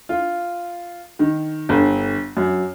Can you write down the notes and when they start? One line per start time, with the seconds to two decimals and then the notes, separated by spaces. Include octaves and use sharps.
0.09 F4
1.19 D#3
1.69 G1
2.37 F#2